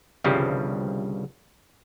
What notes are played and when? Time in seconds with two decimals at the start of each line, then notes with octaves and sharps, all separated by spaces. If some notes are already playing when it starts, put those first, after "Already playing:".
0.24 G1 C2 G2 C#3 F3 G3